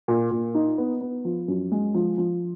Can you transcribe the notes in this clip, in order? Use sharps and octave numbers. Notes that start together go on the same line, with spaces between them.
A#2
A#2
D#4
B3
B3
F3
F#2
G#3
F3
F3